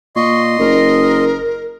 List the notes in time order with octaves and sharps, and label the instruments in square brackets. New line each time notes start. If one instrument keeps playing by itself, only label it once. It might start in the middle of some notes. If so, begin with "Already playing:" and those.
[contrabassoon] A#2 [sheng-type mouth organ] D#5 C6 [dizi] C#6
[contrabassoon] F#1 [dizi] A#4